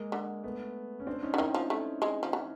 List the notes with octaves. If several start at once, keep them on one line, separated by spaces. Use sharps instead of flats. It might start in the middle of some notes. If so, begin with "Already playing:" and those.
Already playing: G#3 A#3
D3
A3 B3
C#4
C4 D4
C#4 D#4
D3
D#3 D4 E4
F3
A3
G#3
F3
E3